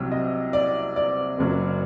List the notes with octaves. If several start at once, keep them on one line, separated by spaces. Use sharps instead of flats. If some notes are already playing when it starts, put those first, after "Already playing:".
Already playing: C2 C3 F#3 G5
D#5
D5
D5
F#1 F#2 F#3